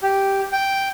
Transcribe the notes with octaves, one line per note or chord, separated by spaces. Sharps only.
G4
G5